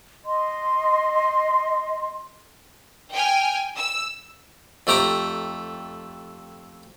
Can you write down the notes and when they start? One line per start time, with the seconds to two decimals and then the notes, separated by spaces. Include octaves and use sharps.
0.25 D#5 C6
3.13 G5 G#5 F6
3.77 E6
4.87 F2 A3 G4 A#5 D6